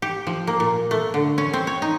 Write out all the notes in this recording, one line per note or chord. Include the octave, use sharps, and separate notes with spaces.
G4
F3
A#3
A#2
A3
D3
C#4
C4
C#5
D#4